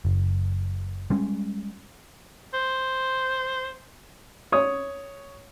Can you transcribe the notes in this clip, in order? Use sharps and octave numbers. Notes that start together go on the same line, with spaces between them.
F#1
G3 G#3 C#4
C5
C#5 D#6